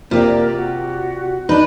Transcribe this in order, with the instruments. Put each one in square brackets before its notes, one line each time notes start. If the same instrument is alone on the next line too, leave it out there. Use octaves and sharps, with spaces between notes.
[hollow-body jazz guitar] C3 [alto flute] A#3 [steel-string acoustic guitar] F4 G4 D5
[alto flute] F#4
[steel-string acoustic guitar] D4 B4 [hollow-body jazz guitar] D#4